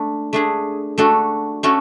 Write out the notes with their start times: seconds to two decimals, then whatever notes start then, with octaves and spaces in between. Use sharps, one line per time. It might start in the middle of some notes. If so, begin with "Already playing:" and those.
Already playing: A3 D4
0.33 A3 D4 G#4
0.98 A3 D4 F#4 A4
1.63 A3 C#4 F#4 A4